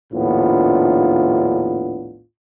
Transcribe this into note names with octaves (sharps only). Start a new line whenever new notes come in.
A#1 D#2 A2 B3 D4 F4